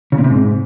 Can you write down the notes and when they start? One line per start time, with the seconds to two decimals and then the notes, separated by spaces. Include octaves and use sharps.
0.12 C#3
0.18 A#2
0.24 C3
0.30 G#2